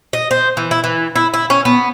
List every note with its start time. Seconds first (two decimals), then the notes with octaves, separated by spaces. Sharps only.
0.13 D#5
0.31 C5
0.57 E3
0.71 E4
0.84 E3
1.16 E4
1.34 E4
1.50 C#4
1.65 B3